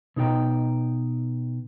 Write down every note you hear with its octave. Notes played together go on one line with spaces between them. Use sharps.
B2 D#4 G#4 G5 A#5